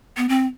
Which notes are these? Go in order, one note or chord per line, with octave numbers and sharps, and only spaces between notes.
B3
C4